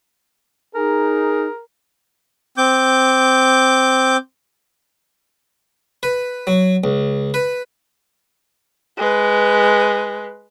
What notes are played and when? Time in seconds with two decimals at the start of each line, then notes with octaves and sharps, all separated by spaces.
0.75 D#4 G#4 A#4
2.57 C4 D6 G6
6.03 B4
6.47 F#3
6.84 C#2
7.34 B4
8.97 G#3 B4